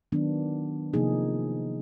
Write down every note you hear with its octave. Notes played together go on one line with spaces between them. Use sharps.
D#3 F#3 B3 D4
C3 F3 A#3 D#4 G#4